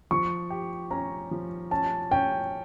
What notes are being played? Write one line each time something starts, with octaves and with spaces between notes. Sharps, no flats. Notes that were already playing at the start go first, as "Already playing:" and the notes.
F3 C#6
G4
C#4 A#5
F3
C#4 A5
C#4 G5